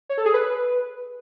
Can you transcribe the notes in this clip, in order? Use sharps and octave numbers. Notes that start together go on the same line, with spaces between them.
C#5
A4
G#4
B4